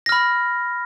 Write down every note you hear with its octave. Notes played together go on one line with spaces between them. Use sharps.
B5 F6 A#6